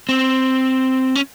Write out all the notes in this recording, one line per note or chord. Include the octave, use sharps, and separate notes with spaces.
C4
C#4